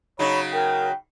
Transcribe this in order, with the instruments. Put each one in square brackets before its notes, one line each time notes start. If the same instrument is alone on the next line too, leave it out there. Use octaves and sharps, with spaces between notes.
[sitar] C#3 F#3 D#4 [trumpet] C#5 [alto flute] B5
[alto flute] A#4 [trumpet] G5